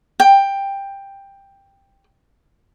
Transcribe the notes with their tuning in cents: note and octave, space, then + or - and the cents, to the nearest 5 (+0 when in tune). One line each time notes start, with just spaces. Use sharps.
G5 +10